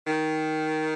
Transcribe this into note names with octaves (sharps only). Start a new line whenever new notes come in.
D#3